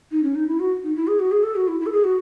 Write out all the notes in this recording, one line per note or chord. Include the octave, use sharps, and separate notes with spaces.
D#4
C#4
D#4
E4
F#4
D#4
E4
G#4
F#4
G#4
A4
F#4
E4
E4
A4
G#4
F#4